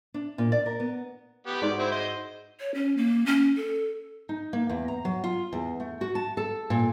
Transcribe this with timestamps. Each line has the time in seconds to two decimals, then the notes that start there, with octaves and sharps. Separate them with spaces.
0.14 D4
0.38 A#2
0.52 D5
0.66 A#4
0.80 B3
1.47 B3 G4
1.62 G#2 F#4 C#5 D5
1.79 C4 E4
1.91 C5 D#5
2.60 C#5
2.74 C#4
2.97 A#3
3.26 C#4
3.57 A4
4.29 D#4
4.53 A#3
4.69 E2
4.88 A#5
5.05 F#3
5.24 F4
5.53 E2
5.80 A3
6.01 F#4
6.15 A5
6.37 A4
6.70 A#2